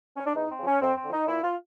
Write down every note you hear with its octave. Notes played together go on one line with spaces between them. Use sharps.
C#4
D4
E2 D#4
C4
C#3 F3
C#4
F2 C4
C4
D3 F3
D#4
A#2 E4
F4